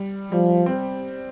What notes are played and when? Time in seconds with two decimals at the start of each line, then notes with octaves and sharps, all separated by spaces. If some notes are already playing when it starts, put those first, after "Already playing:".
Already playing: G3
0.32 F3 G3
0.66 C4